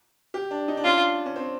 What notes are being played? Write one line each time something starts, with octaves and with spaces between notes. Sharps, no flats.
G4
D4
D#4
D4
C#4 F4
D4
C#4
C4